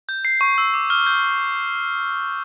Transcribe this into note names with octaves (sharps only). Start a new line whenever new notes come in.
G6
C7
C#6
E6
D6
F6
G6